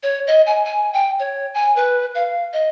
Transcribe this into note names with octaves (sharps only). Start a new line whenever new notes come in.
C#5
D#5
G#5
G#5
G5
C#5
G#5
B4
F5
D#5